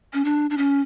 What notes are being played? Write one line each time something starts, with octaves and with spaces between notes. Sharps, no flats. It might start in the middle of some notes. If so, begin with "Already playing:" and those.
C#4
D4
D4
C#4